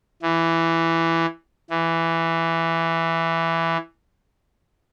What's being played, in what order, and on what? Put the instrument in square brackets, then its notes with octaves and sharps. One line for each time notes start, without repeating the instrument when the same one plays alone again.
[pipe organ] E3
E3